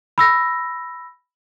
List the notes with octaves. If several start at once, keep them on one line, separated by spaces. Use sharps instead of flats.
B5 E6 A#6